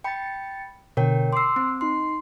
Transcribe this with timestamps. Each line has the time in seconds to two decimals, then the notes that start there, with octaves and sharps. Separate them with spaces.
0.04 G5 B5 A6 C#7
0.97 B2 D3 A#4 C#5 G5
1.33 C6 D6 E6 C7
1.56 C4
1.81 D#4 C6 C7